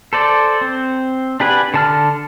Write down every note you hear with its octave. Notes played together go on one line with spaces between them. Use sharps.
A4 C5 D5
C4
D4 G4 B4 F#5 G#5
D3 A5 F6